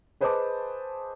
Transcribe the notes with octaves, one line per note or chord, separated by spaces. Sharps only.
G#4 B4 C5 D#5 A5 D6